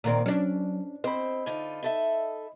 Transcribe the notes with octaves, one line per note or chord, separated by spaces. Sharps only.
A#2 D#3 C4
F#3 C#4 D4
C4 C5 D#5 B5
D3 D#4 F4
D#4 A4 E5